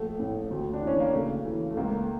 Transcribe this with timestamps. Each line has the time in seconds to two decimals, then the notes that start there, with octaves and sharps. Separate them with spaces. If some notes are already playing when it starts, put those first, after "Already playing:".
Already playing: A#1 A3
0.20 A2
0.50 D2
0.73 D4
0.82 E3 C#4
1.00 A#3
1.13 C#3 A3
1.45 E3
1.71 A3
1.77 C#2 A#3